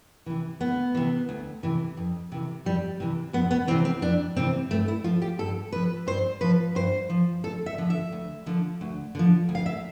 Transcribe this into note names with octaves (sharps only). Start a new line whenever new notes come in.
C3 E3
D2 B3
C3 E3
D2
C3 E3
F2
C3 E3
F2 G3
C3 E3
F2 B3
B3
C3 E3 C4
C4
F2 D4
C3 E3 C4
G2 A3
E4
F3 F4
G4
G2 A4
F3 B4
G2 C5
F3 B4
G2 C5
F3
D2 A4
E5
D3 F3
E5
D2
D3 F3
D2
D3 F3
D2
F5
E5